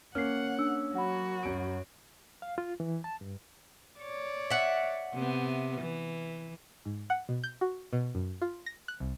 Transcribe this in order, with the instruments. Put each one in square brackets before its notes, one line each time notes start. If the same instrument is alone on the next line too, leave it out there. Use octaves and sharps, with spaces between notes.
[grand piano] A#3 C#4 [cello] F#5 [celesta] F6 C7
[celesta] D4 E6
[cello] F#3 F#4 [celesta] F#5 B5
[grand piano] F#2 D7
[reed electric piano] F5
F4
E3
A5
G2
[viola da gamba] C#5 D5
[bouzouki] E5 F#5
[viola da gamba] C3 B3
E3
[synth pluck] G#2
F#5
B2
G6
F#4
B2
F#2
F4
A#6
F#6
C2